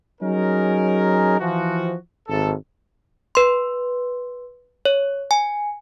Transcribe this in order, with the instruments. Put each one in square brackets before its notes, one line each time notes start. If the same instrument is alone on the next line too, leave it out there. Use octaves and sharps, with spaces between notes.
[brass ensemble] F#3 C#4 D#4 G#4 A#4
E3 F3 F#4
G#1 A4
[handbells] B4 C6
C#5
G#5